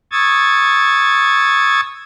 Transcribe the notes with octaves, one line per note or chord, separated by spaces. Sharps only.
C#6 D#6 E6 G#6 A6